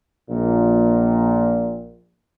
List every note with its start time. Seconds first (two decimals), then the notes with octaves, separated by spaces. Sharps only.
0.30 A#1 A#2